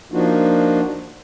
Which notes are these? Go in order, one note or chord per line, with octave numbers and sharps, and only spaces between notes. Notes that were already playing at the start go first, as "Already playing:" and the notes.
F3 A#3 D4 D#4 F4 F#4